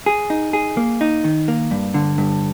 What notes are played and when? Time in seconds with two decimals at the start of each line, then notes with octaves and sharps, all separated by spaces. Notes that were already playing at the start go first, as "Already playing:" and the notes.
0.06 G#4
0.30 D#4
0.53 G#4
0.77 A#3
1.01 D#4
1.24 D#3
1.48 A#3
1.71 G2
1.94 D3
2.18 G2